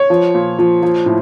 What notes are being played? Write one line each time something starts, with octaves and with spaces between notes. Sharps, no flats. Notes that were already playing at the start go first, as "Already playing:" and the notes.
Already playing: C#5
F3
A#2
F3
F3
A2